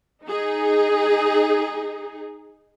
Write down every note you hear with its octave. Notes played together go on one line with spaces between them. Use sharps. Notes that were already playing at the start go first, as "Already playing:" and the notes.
D#4 G#4